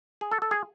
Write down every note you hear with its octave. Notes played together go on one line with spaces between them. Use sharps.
G#4
A4
A4
G#4